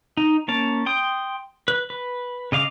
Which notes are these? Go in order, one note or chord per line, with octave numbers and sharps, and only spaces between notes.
D#4
A#3 C#4 A5
G5 C6 D#6
B4
B4
C#3 D#5 F5 D6